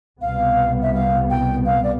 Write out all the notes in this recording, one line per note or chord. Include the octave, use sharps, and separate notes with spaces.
C2 B2 G3 B3 F5
E5
F5
G5
F5
D5